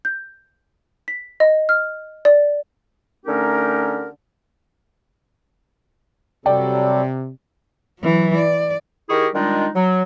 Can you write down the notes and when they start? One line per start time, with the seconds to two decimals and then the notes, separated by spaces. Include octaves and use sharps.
0.05 G6
1.08 B6
1.40 D#5
1.69 F6
2.25 D5
3.26 D3 A3 C#4 D#4 G4 A#4
6.46 C3 F#3 G3 A4 D5 G5
7.99 E3 F#3
8.37 D5
9.10 D#3 E4 G4 G#4 A#4 C#6
9.34 D#3 G3 G#3 D4 D#4 F4
9.76 F#3